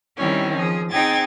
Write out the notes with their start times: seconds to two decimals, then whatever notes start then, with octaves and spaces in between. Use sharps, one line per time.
0.17 D#3 G3 C4 C#4 E4
0.56 F3 G#4
0.90 C4 D#4 G#4 G5 G#6 A6